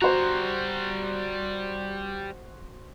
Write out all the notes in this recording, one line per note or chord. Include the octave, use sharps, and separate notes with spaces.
G3 F#4 C5 A#5